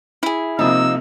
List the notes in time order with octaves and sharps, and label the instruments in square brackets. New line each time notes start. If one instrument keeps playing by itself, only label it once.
[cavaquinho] E4 G#4
[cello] C3 A#3 [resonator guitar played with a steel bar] F3 D#4 [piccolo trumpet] E6